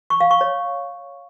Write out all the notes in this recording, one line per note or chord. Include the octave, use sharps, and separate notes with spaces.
C#6
F5
C#6
C#5